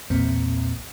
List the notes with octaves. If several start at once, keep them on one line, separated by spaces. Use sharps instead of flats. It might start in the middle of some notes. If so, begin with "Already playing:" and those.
B1 E2 A#2 C4